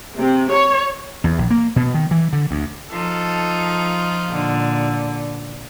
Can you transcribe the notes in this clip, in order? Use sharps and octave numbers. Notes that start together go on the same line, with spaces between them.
C3
C#5
E2
A#1
A#3
B2
D#3
E3
D3
D2
F3 D#4 F4 A4
A#2 D3